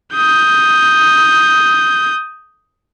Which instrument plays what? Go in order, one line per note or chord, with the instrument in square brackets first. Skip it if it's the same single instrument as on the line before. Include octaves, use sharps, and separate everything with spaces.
[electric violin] D#6 G6